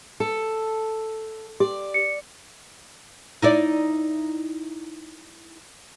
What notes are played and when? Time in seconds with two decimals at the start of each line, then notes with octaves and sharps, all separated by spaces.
0.20 A4
1.60 G4 D5
1.94 C#7
3.42 D#4 E4 D5